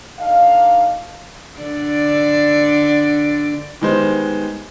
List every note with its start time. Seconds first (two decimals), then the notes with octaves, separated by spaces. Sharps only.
0.19 D4 D#4 A4 D#5 F5
1.60 D3 D5
3.81 D#3 G3 G#3 B3 C5